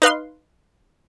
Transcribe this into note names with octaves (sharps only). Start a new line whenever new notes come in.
D#4 B4 F5 C6